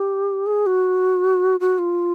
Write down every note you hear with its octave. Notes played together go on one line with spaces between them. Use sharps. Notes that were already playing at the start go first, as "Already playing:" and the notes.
Already playing: G4
G#4
F#4
F#4
F4